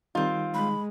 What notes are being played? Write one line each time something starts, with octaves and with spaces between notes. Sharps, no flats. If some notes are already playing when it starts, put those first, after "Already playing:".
D#3 G3 C4 D#4 F4
G#3 B5